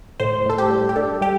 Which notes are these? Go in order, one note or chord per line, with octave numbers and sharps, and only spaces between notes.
A2 C5
A2 A4
G4
G3
G4
D4 A4
G3 G4